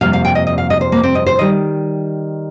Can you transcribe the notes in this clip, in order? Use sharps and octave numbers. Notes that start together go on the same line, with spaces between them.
F2 C3 G3 A#3 F5
F5
G5
D#5
D#5
F5
D#5
C5
A#3
C4
D#5
C5
D#3 G3 D#5